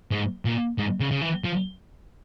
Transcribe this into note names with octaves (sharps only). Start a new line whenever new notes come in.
G#2
A#2
G#2
C#3
C#3
E3
F3